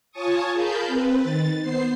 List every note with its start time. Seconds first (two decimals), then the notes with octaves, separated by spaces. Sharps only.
0.11 F4 C#5 G#5 A5 C#6 D#6
0.53 G#4 A#4 F5 A5 B5 G6
0.87 C4 B4
1.22 D#3 A6
1.62 B3 C5 C7